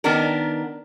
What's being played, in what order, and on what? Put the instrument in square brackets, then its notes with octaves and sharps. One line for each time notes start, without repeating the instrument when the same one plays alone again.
[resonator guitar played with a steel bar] D#3 B3 D4 A#4